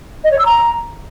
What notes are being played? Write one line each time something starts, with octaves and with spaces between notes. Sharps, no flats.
D#5
C#5
E6
A#5